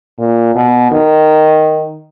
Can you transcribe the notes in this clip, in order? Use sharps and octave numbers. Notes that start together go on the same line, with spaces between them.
A#2
B2
D#3